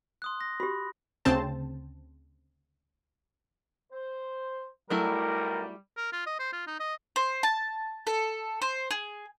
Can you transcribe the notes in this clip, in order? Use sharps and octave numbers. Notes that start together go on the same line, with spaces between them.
C6 D#6 F#6
A#6
F#4 G4 B5
D2 C#3 C4 C5 A5
C5
B1 F#3 G3 A3 E4 A#4
A#4
F4
D#5
C5
F4
D#4
D#5
C5
A5
A4
C5
G#4